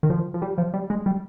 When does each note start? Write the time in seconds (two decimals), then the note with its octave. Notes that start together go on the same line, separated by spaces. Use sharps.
0.03 D#3
0.10 F3
0.34 F3
0.42 G3
0.58 F3
0.74 G3
0.90 G#3
1.06 G3